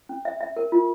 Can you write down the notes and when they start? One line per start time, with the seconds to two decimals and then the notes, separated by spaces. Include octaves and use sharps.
0.09 C#4
0.25 E5
0.41 E5
0.56 A#4
0.72 F4